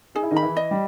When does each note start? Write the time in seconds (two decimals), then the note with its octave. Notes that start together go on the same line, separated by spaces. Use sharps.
0.15 D#4 G#4
0.23 E4
0.31 D#3 D#4
0.37 B5
0.42 E3 E4
0.57 D#5
0.71 G3 G4